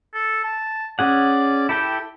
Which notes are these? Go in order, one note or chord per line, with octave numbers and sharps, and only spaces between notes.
A4
A5
C#4 G#4 D5 F#5
E4 G4 A4 G5